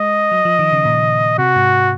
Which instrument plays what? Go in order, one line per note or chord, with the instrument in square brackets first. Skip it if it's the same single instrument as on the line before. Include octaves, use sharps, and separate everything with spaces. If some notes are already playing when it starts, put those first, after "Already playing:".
Already playing: [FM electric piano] G#3 [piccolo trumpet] D#5
[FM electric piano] F#3
F3
D#3
C#3
A#2
[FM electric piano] C3 [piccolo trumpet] F#4
[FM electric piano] G#2